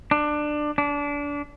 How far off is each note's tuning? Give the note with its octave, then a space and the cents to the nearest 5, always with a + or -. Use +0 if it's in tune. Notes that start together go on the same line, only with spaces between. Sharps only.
D4 +20
D4 -25